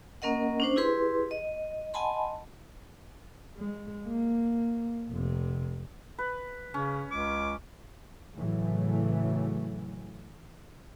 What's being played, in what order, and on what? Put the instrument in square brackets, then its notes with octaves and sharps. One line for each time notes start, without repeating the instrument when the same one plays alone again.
[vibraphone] A#3 C#4 A#4 D#5 F#5
C#4 D4 C5
E4 G4 G#4 B4 C6
D#5
D#5 F#5 G#5 A5 B5 C6
[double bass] G#3
A#3
F1 C3
[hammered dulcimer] B4
[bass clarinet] C#3 [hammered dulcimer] C#4
[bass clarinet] C#2 [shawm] D6
[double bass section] A2 C#3 E3 F#3 A3